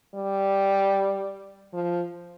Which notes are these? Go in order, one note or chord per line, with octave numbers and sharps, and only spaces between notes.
G3
F3